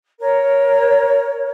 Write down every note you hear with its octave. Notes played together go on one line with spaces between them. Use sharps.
A#4 C#5